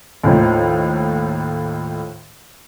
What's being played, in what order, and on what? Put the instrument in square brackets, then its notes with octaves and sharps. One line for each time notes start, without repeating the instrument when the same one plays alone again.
[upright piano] D#2 A2 D#3 F3